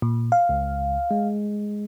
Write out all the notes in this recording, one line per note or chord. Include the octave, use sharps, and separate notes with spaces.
A#2
F5
C#2
G#3